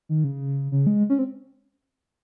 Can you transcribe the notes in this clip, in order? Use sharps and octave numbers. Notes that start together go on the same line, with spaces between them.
D#3
C#3
C#3
G#3
C#4
C4